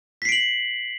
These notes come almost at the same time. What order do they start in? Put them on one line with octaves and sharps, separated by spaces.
B6 C7 D7 F#7